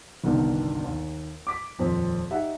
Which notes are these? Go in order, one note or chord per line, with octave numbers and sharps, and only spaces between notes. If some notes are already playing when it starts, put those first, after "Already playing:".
G1 C2 G2 B2 D3 D#3
D#2
D6 B6
D#1 F2 C4
D#4 G4 E5 F#5